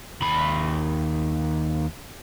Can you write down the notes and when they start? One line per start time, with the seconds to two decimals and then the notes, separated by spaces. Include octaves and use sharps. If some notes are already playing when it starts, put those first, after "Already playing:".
0.22 D#2 B5